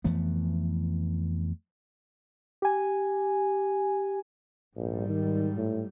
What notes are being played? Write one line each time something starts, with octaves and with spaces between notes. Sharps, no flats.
F2 E3 A3 B3
G4 G#5
A#1 G#2 G3
D#3
A2